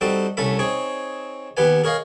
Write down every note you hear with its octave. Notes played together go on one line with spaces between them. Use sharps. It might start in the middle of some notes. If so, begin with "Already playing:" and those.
G3 C4 D#4 F#4 A4
C2 A3 C#4 A4 B5
C4 D#4 G#4 C#5
D#2 B3 G4 B4 G#5
G#4 A#4 C#5 D#5 F5